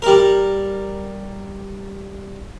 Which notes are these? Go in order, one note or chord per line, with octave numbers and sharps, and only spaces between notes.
G3 A#4